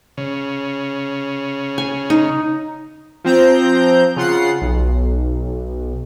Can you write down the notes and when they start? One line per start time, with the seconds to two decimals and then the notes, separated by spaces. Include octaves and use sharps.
0.18 C#3
1.78 G#5
2.10 D#4
3.24 F3 C4 A#5 G6
4.16 C#3 F4 F#5 C7
4.62 B1